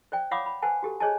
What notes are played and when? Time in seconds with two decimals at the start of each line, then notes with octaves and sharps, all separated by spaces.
0.12 C5 D5 G5
0.31 C#5 F5 F#5 B5 D6 D#6
0.46 B5
0.62 B4 C5 F#5 G#5 A5
0.83 F#4 G4 A4
1.00 G#4 C5 C#5 D#5 G#5 A5